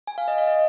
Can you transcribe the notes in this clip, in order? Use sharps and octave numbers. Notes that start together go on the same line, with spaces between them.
G#5
F5
D#5
F5
D#5